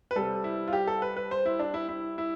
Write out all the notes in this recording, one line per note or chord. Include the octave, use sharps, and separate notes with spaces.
B4
C3 G3 A4
E4
F4
G4
A4
B4
B4
C5
E4
D4
E4
E4
E4